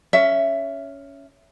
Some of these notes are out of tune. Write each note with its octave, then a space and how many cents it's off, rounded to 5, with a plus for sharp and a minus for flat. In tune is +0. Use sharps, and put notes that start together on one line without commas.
C#4 +10 E5 +15